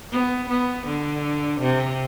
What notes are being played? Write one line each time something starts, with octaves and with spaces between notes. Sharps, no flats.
B3
B3
D3
C3